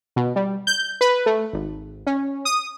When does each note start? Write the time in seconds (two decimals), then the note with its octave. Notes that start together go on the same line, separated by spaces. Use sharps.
0.16 B2
0.36 G3
0.67 G6
1.01 B4
1.26 A3
1.53 G#1
2.07 C#4
2.45 D#6